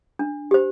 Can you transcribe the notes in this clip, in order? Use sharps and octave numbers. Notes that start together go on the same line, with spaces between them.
D4
G4 C5